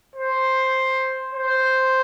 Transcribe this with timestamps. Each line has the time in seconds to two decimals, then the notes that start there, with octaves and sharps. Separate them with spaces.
0.15 C5
1.34 C5